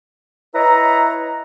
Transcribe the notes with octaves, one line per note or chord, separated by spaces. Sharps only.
E4 B4 C#5 D#5 E5 A#5